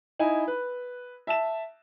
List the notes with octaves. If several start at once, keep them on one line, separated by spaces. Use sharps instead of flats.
D#4 E4 G#5
B4
E5 A5 E7